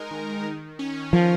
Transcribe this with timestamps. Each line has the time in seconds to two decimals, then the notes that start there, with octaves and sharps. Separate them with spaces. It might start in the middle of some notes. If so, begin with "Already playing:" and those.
Already playing: G#3 D#4 A#4
0.11 D#3
0.45 D#3
0.79 C#4
1.13 F3 A#4